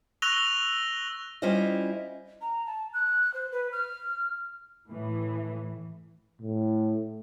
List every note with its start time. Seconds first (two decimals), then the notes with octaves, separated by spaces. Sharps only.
0.22 C#6 E6 F#6 A#6 F7 G7
1.42 G3 C#4 E4 F4 C5 D#5
2.41 A#5
2.66 A5
2.94 F#6
3.34 C5
3.52 B4
3.72 F6
4.88 A2 E3
6.42 A2